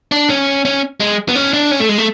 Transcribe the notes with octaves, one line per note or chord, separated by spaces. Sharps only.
D4
C#4
C#4
G#3
B3
C#4
D4
C#4
A3
G#3
A3